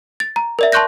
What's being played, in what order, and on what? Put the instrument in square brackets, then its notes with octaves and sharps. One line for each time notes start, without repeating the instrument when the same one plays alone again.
[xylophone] A6
A#5
A#4 D5 E5
A5 C6 C#6 F#6 G6 A#6